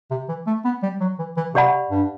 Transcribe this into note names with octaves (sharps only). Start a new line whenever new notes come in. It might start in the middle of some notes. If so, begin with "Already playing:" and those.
C3
E3
A3
B3
G3
F#3
E3
E3
C3 G4 D5 F#5 B5
G2